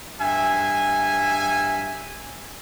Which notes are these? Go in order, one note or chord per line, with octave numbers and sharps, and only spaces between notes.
G2 E5 G#5